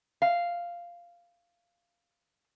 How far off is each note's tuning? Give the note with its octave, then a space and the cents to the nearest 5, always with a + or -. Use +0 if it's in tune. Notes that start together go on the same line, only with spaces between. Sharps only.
F5 -5